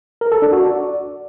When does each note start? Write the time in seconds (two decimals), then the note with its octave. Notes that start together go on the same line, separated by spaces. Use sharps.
0.21 A#4
0.32 A4
0.42 D4
0.53 F#4
0.63 D5